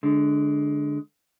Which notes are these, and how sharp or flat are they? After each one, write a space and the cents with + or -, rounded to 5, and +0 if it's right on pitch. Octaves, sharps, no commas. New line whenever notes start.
D3 +0 G#3 +20